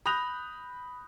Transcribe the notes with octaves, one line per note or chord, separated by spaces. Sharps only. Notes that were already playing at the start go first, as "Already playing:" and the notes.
B5 D#6 F#6 G6 A#6 F7